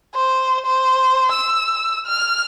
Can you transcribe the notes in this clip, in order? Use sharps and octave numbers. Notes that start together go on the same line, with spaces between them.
C5
C5
E6
F6